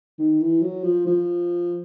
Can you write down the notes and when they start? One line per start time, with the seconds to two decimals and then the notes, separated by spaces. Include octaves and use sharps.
0.18 D#3
0.40 E3
0.62 F#3
0.84 F3
1.07 F3